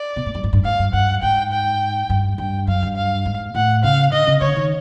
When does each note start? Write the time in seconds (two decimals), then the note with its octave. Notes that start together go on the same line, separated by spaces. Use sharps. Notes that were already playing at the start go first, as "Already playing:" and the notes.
Already playing: D5
0.16 B2
0.26 A2
0.35 G2
0.44 G#2
0.53 G2
0.64 G#2 F5
0.79 G2
0.93 G2 F#5
1.22 G#2 G5
1.52 G5
2.10 G2
2.38 G2 G5
2.67 F#2 F5
2.83 G2
2.96 F5
3.26 G#2
3.55 A2 F#5
3.84 C#3 F5
4.12 D3 D#5
4.27 C#3
4.41 D3 C#5
4.56 D#3